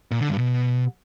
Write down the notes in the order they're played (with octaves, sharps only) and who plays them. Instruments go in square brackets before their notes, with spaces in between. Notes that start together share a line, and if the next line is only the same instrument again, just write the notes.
[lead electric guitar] A#2
D3
G2
B2